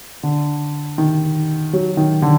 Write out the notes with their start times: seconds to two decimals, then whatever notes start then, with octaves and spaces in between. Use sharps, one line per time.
0.23 D3
0.98 D#3
1.73 F#3
1.97 D#3
2.22 D3